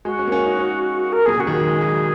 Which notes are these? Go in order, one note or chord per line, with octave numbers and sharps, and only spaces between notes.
G#3 F#4
C#4
A#3
C#4
D#4
C#4
A#4
A#2 G#4
C#3 F#4
D#3
F#3 G#4
G#3
F#3